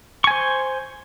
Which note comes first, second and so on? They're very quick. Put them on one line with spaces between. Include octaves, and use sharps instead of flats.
C#6 G#5 C5